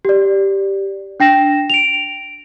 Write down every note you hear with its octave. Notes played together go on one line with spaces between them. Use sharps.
G4 D5
D4 G5 A#6 E7
D7 F7